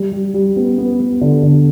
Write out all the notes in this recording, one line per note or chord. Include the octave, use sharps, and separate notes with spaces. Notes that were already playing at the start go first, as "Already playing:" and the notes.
Already playing: G3
G3
G3
B3
B3
B3
D3
D3